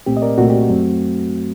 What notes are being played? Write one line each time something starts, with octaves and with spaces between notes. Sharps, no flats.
C2 A#2 A3 C4 G4
D#5
A#4 D5
C2 A#2 A3 C4 F#4
G4
F#4
F#2 F#3 A3 C4